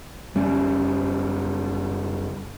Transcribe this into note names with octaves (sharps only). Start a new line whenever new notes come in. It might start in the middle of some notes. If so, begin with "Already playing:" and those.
F#1 G3 C#4